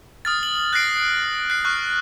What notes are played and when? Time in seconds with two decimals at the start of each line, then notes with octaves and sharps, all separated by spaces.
0.25 D#6 F6 A6
0.43 F#7
0.73 F#6 A6 A#6 C7 D7
1.50 F#6 C7
1.65 C#6 F6 F#6